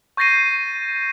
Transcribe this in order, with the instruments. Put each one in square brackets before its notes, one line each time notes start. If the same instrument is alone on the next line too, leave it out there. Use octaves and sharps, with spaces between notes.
[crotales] C#6 G6 A6 A#6 C7 D#7